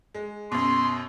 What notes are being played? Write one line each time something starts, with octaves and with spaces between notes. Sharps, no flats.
G#3
F#2 B2 C6